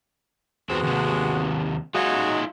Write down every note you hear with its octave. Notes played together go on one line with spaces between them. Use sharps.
E2 G#3 B3 C4 F#4
D#2 C3
F#3 G#3 D#4 F4 F#4